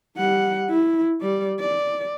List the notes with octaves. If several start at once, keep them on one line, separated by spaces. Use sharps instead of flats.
G3 F#5
E4
G3 D5
D5